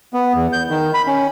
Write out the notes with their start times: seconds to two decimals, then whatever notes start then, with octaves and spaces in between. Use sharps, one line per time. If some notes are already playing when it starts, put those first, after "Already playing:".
0.14 B3
0.34 E2
0.53 G6
0.70 D#3
0.94 B5
1.07 C#4